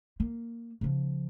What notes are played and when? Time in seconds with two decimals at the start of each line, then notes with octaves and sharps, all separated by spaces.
0.20 A#3
0.81 C#3 F3